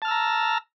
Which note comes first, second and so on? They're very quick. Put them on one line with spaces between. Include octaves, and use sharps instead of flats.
A5 F6 E6 A#5